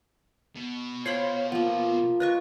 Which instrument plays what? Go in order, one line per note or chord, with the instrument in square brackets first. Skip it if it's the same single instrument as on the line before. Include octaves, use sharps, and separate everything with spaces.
[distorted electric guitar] B2
[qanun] C5 G5 B5 [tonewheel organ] C#5 F5
[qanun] F3 A#3 [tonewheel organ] B3
[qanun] F4 D#5 C#6 [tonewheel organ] B4